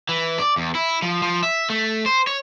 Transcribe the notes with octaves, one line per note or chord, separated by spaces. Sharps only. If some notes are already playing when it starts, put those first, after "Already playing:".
E3
D5
E2
E4
F3
F3
E5
A3
C5
C#5